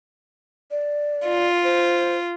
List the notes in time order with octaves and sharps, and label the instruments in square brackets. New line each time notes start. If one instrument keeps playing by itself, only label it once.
[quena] D5
[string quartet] F4
[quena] C5